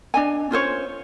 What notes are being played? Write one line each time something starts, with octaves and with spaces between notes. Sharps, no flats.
D4 D#5 G#5
C#4 F4 C5 C#5